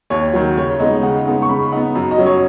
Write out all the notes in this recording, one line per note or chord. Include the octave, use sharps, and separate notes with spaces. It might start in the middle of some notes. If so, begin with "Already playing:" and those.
D#2 C#5
D#3 F#3
C#3 C#5
G#3 B3 D#4 D#5
C#3 F#5
G#3 B3 D#4
C#6
C#3 B5
B3 D#4 F#5
F#2
D#5
F#3 C#4
C#5